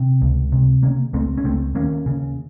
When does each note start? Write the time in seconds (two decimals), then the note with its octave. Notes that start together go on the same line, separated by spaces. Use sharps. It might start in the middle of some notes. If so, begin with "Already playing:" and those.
Already playing: C3
0.22 C#2
0.52 C3
0.83 C#3 A#3 C#4
1.13 C#2 A3 C4
1.38 C#4
1.44 C#2 A3 C4
1.75 D#2 A#3 C#4
2.06 C#3